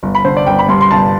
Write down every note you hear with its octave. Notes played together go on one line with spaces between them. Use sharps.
G1
B5
D3 C5
D5
G1 G5
B5
G2 C6
C6
G1 A5